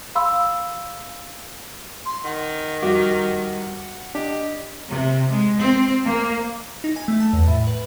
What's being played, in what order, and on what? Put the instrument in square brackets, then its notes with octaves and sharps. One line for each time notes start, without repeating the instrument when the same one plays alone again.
[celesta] F5 B5 C6 E6
[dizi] C6
[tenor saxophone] D#3 [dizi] F#5
[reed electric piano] F2 G3 D6 [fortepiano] F#4 [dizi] F#5
[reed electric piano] D4 [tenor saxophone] G4 [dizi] D#5
[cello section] C3
G#3
C4
A#3
[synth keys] D#4
G#5
A3
A5
E2
A2
B4